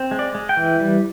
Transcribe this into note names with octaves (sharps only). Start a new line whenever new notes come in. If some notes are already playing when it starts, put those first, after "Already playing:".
Already playing: C4
G#3
D5
G#3
G5
E3
G3